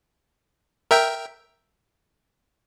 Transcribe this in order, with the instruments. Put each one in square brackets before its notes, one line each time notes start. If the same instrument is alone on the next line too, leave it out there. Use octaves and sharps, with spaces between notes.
[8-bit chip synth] A#4 E5 G5